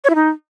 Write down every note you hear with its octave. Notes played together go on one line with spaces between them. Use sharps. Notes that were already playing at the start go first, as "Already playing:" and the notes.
C#5
E4
D#4